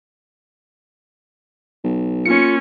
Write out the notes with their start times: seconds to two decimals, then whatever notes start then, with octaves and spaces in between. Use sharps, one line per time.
1.84 B1
2.25 A#3 C#4 F4 C#7